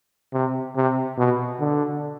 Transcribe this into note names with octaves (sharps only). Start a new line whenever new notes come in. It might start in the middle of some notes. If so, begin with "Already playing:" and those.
C3
C3
B2
D3